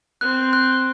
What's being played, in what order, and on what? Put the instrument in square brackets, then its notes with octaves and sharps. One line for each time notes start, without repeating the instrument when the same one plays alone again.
[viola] C4 [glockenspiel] F#6
[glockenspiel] F#6